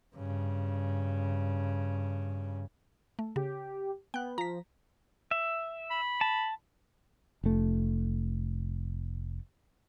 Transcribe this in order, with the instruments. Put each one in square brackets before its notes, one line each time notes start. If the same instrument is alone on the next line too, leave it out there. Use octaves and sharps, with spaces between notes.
[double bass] G2 C#3
[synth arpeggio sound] A3
[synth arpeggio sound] C#3 [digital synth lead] G4
[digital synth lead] B3 [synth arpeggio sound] G5 F#6
[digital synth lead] F3 [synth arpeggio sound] A#5 B6
[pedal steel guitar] E5
[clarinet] B5
[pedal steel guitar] A5
[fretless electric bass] F1 A3